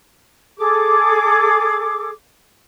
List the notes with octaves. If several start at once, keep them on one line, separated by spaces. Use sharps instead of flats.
G#4 A4 D6